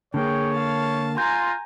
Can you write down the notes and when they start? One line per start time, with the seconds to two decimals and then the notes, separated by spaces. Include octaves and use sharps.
0.14 D3 A#3 G#4 C#5 G5
0.54 F5 A5
1.17 F4 G#5 A#5 C6 G6 A#6